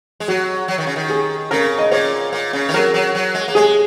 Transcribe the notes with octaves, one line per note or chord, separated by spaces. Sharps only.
G#3
F#3 F#4
F#3
D#3
C#3
D#3
G#4
C#3 A#4
D#5
A#2 C#5
A#2
C#3
D#3
F#3 A#4
F#3
F#3
G#3
A#3
G#3 G#4